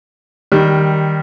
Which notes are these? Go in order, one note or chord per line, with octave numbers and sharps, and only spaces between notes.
D#3 G3